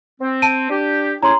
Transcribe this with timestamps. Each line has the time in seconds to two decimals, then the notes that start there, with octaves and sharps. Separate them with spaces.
0.21 C4
0.42 A5 D7 D#7
0.70 D4 G4
1.23 C#4 E4 G#4 A#5 C6